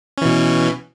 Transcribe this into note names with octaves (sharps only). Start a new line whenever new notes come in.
B2 E3 C#4